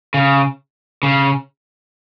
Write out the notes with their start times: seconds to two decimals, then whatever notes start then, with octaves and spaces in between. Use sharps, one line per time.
0.14 C#3
1.03 C#3